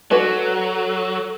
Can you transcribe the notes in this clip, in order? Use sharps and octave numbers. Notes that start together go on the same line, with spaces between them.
F#3 F#4 A4 B4 D5